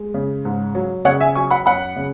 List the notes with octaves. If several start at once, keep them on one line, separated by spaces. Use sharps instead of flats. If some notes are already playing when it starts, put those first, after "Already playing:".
Already playing: G#3
C#3
G#2
F#3
C#3 C#5 F#5
E5 G#5
F#3 G#5 C#6
F#5 B5
F#2 F#5 B5
C#3